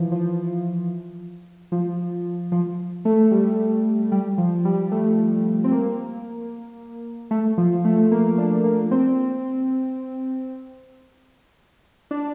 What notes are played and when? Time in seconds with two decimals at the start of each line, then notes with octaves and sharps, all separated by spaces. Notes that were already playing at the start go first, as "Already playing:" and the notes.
Already playing: E3 F3
0.12 F3
1.72 F3
2.52 F3
3.05 A3
3.31 G3
4.12 G3
4.38 F3
4.65 G3
4.92 A3
5.64 C4
5.72 A#3
7.31 A3
7.58 F3
7.85 A3
8.12 A#3
8.38 D4
8.64 A#3
8.91 C4
12.11 D4